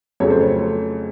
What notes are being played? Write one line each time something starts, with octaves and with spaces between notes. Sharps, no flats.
F2 C#3 F#3 A3 C#5
C5
C#5